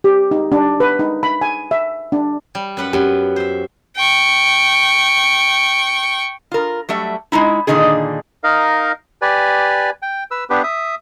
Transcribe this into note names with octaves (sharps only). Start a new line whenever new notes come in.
G4
D#4
D4
B4
D#4
B5
G#5
E5
D4
G3
F#2 B4 F#5
F#2 B3 G4
C5 E5
G5 C#6
F4 A#4
F#3 G3 A3 E5
G#3 A3 D#4 E4
A#2 D3 D#3 D#4 G#4
D#4 A#4 D#5 F5
G4 B4 D5 G#5
G5
B4 E6
B3 D4 G4 B4
E5 D#6